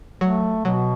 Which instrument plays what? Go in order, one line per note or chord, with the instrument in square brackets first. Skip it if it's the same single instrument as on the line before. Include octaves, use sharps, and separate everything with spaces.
[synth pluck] F#3 [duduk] A3
[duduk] B2 [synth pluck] F#3